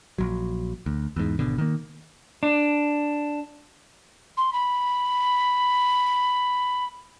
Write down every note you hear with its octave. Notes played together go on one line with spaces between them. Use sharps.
A#1 F#3
D2
E2 G#2
G#1 B2 D3
D#3 A#3
D4
C6
B5